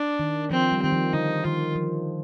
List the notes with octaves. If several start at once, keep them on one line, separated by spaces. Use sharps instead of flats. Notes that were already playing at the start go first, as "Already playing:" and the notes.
Already playing: D4
D#3
F3 C4
G3
D#3 C4
F3
D3 D#4
D#3 F4
F3